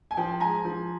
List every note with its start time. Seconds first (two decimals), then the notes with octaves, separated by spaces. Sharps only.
0.11 G#5
0.17 F3 G5 A5
0.40 G#3 G#5 A#5
0.65 F3